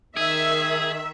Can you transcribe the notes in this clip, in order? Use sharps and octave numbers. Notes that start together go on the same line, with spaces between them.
D#3 G#4 E5